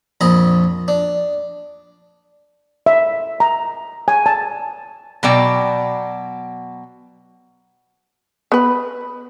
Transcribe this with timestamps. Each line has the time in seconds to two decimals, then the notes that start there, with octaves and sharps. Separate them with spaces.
0.21 A#1 F2 D#5 A#5 B5
0.88 D4
2.86 E5
3.40 A#5
4.08 G#5
4.26 A5
5.23 B2 F#3 D5 G5
8.52 B3 B4